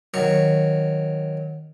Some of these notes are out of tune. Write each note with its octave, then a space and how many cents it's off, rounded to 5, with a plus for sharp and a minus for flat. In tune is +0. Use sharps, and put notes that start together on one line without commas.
D#3 +0 F#3 -10 C#6 +0